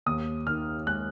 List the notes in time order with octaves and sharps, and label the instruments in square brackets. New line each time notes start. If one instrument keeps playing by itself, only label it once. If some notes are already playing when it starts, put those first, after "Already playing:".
[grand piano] D#2 D#6
D#3 F6
G#3 F#6